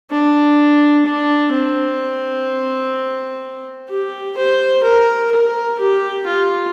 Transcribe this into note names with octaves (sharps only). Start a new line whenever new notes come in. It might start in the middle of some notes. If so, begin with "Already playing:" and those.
D4
D4
C4
G4
C5
A#4
A#4
G4
F4